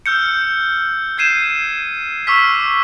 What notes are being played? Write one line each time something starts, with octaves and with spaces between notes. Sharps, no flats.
E6 F6 G6 C#7
G6 G#6 C7 D#7 E7
C#6 D6 E6 F6 B6